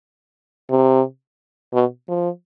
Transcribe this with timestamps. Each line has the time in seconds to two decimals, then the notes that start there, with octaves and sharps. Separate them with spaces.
0.70 C3
1.73 B2
2.08 F3